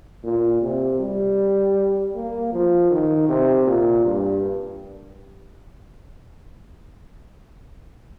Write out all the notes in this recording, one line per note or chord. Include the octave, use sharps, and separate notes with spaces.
A#2
C3
G3
A#3
F3
D#3
C3
A#2
G2